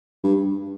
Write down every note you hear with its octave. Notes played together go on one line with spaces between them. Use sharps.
G2